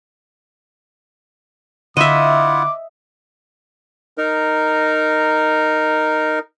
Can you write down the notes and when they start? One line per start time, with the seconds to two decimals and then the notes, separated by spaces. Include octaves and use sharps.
1.97 D3 E4 F4 D#5 E5 F#5 D6
4.18 D#4 A#4